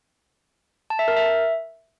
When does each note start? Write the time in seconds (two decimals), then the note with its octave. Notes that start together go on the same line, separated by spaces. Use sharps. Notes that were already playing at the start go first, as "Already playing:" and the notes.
0.90 A5
0.99 E5
1.08 A#4
1.17 E5